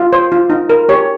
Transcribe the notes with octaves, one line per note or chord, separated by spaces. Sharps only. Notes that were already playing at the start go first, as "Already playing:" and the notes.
Already playing: F4
C5
F4
D#4
A#4
G4 C#5